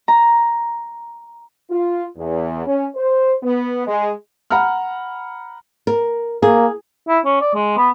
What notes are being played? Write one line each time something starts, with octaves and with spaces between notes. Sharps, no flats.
A#5
F4
E2
C#4
C5
B3
G#3
F#5 A#5 B5 F6
A#4
A#3 G#4
E4
C#4
D5
G#3
B3